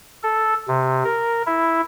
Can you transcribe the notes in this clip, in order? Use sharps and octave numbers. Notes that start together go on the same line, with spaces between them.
A4
C3
A#4
E4